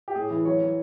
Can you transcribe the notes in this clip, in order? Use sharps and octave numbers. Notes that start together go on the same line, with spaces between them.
G4
A2 G#4
E3
F#3 C#5
F#3